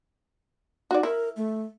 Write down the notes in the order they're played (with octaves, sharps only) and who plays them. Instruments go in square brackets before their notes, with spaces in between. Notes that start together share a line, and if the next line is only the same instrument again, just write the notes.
[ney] D#4 [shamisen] F#4 D5
[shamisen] E4 [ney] A#4
[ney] A3